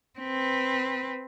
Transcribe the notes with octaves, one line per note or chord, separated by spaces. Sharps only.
C4 B4